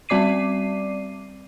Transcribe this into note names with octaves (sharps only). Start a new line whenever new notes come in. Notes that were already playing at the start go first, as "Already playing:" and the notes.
G3 C4 D5 D6 C7 D#7